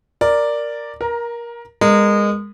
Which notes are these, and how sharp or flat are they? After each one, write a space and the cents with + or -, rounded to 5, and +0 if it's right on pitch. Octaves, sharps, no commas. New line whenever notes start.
A#4 +0 D5 +0
A#4 +20 A#5 +0
G#3 -25 B3 -10 A#4 -20